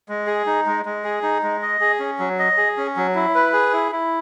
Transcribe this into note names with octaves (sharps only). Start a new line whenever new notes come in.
G#3
G#4
D#4
G#3
G#3
G#4
D#4
G#3
D#5
G#4
C#4
F#3
D#5
G#4
C#4
F#3
E4
B4
G#4
E4
E4